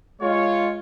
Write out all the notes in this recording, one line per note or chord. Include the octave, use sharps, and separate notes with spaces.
G#3 F4 C#5